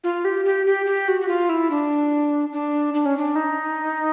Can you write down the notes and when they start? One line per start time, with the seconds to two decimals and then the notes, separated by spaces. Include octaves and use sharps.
0.04 F4
0.25 G4
0.45 G4
0.66 G4
0.86 G4
1.08 F#4
1.21 F#4
1.28 F4
1.49 E4
1.70 D4
2.53 D4
2.94 D4
3.06 C#4
3.18 D4
3.36 D#4